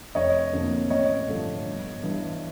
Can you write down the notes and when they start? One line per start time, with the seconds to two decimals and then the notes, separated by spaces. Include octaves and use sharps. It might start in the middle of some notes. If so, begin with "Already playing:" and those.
0.15 F1 C#5 D#5
0.53 F2 D3 F3 A#3
0.90 A1 C#5 D#5
1.28 G2 D3 F3 A3
1.66 G1
2.03 G2 E3 G3